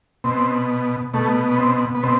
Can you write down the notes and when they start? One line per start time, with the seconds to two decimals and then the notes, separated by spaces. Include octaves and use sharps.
0.24 B2 C4
1.13 B2 A3
1.51 B3
1.59 C4
1.95 B3
2.03 B2 C4